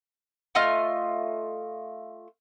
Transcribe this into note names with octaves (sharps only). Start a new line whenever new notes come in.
A3 F4 D#5 F6